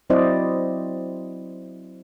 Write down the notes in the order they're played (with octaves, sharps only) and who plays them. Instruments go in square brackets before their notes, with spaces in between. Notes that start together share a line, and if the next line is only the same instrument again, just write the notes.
[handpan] F#3 C4 E4 C5 D5 D#5